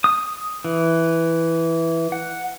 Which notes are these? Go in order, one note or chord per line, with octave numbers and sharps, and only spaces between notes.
D#6
E3
F#5